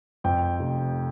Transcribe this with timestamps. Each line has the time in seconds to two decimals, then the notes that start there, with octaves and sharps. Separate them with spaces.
0.24 F2 G5
0.60 F1